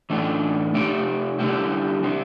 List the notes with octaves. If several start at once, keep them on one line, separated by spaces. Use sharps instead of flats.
A2 E3 A3 D4
C3 A3 C4 G4
D3 G3 E4 G4
C3 G3 C4